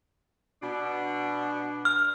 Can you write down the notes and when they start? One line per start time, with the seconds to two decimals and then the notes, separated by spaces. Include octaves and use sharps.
0.62 B2 D4
1.85 F6